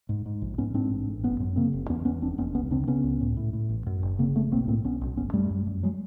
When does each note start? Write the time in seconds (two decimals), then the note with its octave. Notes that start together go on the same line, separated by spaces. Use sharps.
0.09 G#2
0.26 G#2
0.42 A#1
0.58 G#2 B3 C#4
0.74 G#2 C4 D4
0.90 A1
1.07 A1
1.24 F#1 B3 C#4
1.40 F#2
1.56 C#3 A#3 C4
1.73 F#1
1.90 E2 B3 C#4
2.05 E2 B3 C#4
2.21 F1 C4 D4
2.38 F1 B3 C#4
2.54 C#2 B3 C#4
2.71 C#3 C4 D4
2.87 C#3 B3 C#4
3.04 C#2
3.21 A2
3.37 A2
3.53 A2
3.69 A1
3.86 F#2
4.02 F#1
4.19 C#3 A#3 C4
4.35 F#1 A3 B3
4.51 B1 A#3 C4
4.68 A2 A#3 C4
4.84 B1 B3 C#4
5.01 B1
5.17 G1 B3 C#4
5.33 F#2 G3 A3
5.50 F#2
5.66 F#2
5.83 F#3 G#3